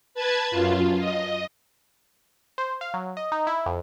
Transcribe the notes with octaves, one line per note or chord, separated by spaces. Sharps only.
B4 A5 G#6
F#2 F4
D#5
C5
F5
F#3
D#5
D#4
E4
F2